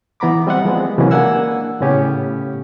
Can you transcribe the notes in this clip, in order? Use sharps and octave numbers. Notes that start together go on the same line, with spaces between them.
E3 B3 A#5 B5 D6
G3 C4 D#5 E5 F#5
F3 G#3 B3 C4
C3 E3 F#3 G#3 A#3 C#4
A#3 D4 F#5 G#5 E6
A2 C#3 B3 C#4 G4